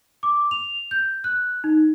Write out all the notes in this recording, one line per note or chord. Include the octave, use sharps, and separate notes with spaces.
D6
F7
G6
F#6
D#4